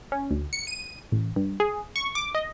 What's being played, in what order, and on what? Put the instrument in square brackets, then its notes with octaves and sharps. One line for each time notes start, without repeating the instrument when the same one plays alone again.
[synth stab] C#4
D2
C#7
D#7
A1
G2
G#4
C#6
D6
D#5